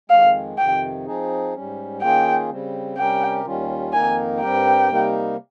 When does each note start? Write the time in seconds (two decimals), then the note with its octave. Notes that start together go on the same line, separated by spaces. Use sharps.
0.10 F2 D#3 G#3 F5
0.58 F2 C3 D#3 G5
1.06 F3 C4 D#4 G#4
1.55 G#2 G3 C#4
2.02 D#3 A#3 C#4 F4 G#4 G5
2.49 C#3 G3 C4
2.97 C3 G3 C#4 G4 A#4 G5
3.45 D#2 D#3 G3 C#4 F4
3.93 F2 D#3 A#3 D#4 A#4 G#5
4.41 G2 G3 C4 G4 A#4 G5
4.89 C3 G3 A#3 D#4 A#4